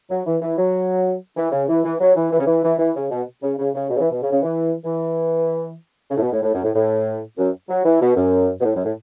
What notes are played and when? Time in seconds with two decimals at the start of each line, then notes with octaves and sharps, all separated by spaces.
0.10 F#3
0.26 E3
0.42 E3
0.58 F#3
1.37 E3
1.52 C#3
1.69 E3
1.84 E3
2.00 F#3
2.16 E3
2.32 E3
2.39 C#3
2.46 E3
2.63 E3
2.79 E3
2.95 C#3
3.11 B2
3.43 C#3
3.59 C#3
3.74 C#3
3.90 B2
3.97 C#3
4.01 E3
4.11 B2
4.22 C#3
4.32 C#3
4.43 E3
4.84 E3
6.11 C#3
6.17 A2
6.22 B2
6.33 A2
6.43 A2
6.53 F#2
6.64 A2
6.75 A2
7.38 F#2
7.69 F#3
7.85 E3
8.01 B2
8.17 F#2
8.60 B2
8.64 A2
8.75 F#2
8.85 A2